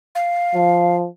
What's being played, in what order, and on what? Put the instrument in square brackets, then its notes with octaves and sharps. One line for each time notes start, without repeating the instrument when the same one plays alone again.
[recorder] F5
[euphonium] F3